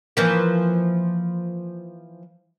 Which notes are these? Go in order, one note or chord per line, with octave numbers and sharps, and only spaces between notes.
E3 F3 A#3